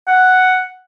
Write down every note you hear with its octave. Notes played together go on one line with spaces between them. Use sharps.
F#5